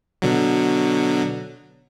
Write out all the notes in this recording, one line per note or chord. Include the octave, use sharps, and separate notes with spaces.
B2 D3 F#3